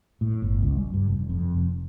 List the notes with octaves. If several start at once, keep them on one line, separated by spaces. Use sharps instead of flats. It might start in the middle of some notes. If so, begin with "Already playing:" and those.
A2
G1
C#2
G3
G2
F1
F2
F1